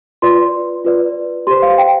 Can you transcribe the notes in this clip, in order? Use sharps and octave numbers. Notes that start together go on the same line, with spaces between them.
F4 B4 D5 C6
F4 B4 D5
G4 C5 C6
F5
G5